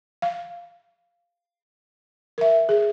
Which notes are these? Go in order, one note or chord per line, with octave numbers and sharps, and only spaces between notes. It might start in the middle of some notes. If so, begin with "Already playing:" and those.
F5
A#4 E5
G#4